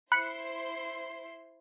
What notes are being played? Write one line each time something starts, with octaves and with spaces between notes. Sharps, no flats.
E4 C5 B5 C6 F#6 C#7